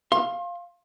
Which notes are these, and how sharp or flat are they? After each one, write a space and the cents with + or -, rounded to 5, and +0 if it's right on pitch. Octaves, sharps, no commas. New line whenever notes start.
F5 +0 C6 +35